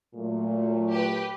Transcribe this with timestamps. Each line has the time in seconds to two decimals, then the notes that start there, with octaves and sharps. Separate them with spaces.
0.15 A#2 F#3 A3
0.90 G4 B4